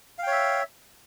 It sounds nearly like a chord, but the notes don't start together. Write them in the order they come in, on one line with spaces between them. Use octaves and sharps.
F5 G5 C#5 E5